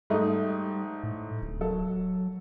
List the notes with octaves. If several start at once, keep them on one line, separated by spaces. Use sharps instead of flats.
G#2 G3 A3 D#4
A2
D1
F#3 A4